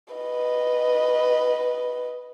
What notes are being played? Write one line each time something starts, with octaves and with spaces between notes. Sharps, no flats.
B4 D#5